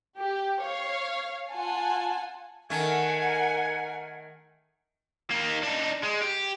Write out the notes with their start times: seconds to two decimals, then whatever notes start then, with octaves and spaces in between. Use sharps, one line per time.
0.19 G4
0.61 C#5 F5
1.50 F4 F#5 G#5 A5
2.70 D#3 A3 A#4 F#5 G#5 G#6
5.30 A#3 D#4
5.63 D4 D#4
6.03 G#3
6.22 G4